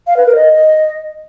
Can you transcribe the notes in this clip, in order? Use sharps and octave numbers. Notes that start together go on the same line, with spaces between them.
F5
B4
A#4
D#5